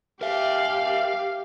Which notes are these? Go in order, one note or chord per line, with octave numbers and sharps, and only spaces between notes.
G4 A#4 E5 F5